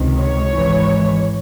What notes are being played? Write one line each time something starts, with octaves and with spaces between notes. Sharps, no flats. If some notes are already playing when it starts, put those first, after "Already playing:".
Already playing: C#2 C3 D#3
C#5
G#1 G#2 E3